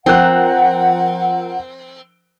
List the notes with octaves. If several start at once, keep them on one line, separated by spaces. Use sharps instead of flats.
F3 C4 A#4 F#5 F#6